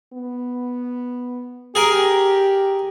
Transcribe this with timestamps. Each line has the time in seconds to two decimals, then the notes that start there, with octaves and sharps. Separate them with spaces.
0.13 B3
1.75 G4 G#4 A#4